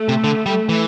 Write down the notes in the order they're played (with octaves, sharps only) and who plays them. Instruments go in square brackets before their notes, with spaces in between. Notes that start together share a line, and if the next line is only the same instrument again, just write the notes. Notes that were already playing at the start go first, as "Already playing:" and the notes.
Already playing: [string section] A3
[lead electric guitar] C3
D3
G3
E3